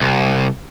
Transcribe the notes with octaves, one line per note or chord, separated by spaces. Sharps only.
C2